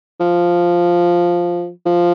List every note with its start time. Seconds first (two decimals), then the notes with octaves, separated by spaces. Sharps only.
0.20 F3
1.86 F3